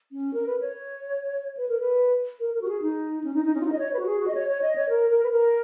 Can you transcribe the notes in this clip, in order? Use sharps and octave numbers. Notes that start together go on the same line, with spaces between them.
C#4
A#4
B4
C#5
B4
A#4
B4
A#4
A#4
F#4
G#4
D#4
C#4
D#4
D#4
C#4
F4
D#4
D#5
C#5
B4
F#4
G#4
F#4
D#5
C#5
C#5
D#5
C#5
A#4
A#4
B4
A#4